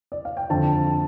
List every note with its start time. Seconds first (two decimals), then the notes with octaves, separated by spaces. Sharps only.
0.12 D5
0.25 F5
0.37 G5
0.49 F2 D3 F3 A5